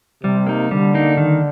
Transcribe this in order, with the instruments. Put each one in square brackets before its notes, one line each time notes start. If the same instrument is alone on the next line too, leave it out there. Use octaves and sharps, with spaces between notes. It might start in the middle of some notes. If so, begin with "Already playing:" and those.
[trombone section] C3 [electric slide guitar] G3
[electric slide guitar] A#3 D#4
[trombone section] D3 [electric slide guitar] G3
[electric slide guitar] A#3 D#4
D#3